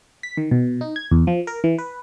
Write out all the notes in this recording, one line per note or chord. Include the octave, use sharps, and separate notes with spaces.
B6
D#3
B2
D#4
G#6
E2
F3
A#4
E3
B4